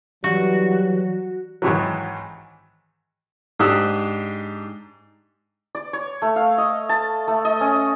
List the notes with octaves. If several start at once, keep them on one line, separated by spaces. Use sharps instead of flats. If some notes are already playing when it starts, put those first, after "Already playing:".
E3 F#3 G3 F#4
G#2 D#3 E3 F#3
G#2 D4 G4 D#6 E6 F#6
D5
C#5
A3
F5
D#5
A5
A3
D#5
C#4